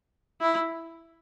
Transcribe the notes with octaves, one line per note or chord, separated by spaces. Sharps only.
E4